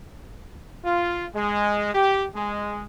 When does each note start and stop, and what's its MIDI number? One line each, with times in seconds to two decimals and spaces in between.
0.85 1.26 65
1.35 1.93 56
1.95 2.26 67
2.35 2.85 56